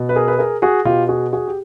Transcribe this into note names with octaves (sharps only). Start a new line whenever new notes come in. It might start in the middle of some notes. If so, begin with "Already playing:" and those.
Already playing: B2
B4
G#4 A#4
B4
G#4 A#4
F#4 G#4
B2 F4 G4
F#4 G#4
F#4 G#4
G4